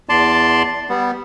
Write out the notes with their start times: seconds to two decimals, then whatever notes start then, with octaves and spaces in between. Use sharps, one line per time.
0.09 E2 D5 A5 C6
0.89 G3 B3